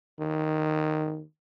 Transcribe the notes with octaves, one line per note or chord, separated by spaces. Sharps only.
D#3